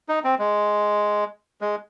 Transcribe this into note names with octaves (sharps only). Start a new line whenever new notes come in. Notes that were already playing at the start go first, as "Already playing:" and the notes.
D#4
C4
G#3
G#3